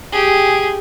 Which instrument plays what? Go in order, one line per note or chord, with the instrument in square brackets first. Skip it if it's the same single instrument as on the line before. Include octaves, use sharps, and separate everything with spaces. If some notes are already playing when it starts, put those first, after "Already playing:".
[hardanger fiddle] G4 G#4